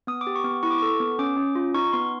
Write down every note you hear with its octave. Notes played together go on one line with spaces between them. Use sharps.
B3 D#6
D6
G4
C#6
B3
E4 C#6
D6
A4 C#6
B3
C#4 D6
C#4
F4
D#4 C#6
B3 C6